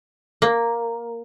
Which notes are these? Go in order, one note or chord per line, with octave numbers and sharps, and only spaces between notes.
A#3